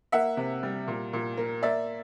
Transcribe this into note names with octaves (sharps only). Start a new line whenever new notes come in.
A#3 E5 F#5
C3
G3
A#2
A#2
A#3
A#3 D5 E5